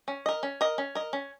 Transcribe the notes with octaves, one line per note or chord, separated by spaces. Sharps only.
C#4
A#4 D#5
C#4
A#4 D#5
C#4
A#4 D#5
C#4